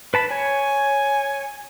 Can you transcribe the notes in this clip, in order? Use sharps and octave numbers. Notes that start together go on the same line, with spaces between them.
B4 A5 B5
C#5 G#5